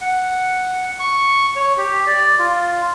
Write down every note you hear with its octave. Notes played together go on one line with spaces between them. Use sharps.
F#5
C#6
C#5
G4
D5
F4